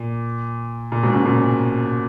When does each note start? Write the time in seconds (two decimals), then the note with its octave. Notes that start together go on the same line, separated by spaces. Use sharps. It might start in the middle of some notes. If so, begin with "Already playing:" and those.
Already playing: A#2
0.92 A#2
1.03 G#2 B2
1.14 A#2 C#3
1.25 A#2 C#3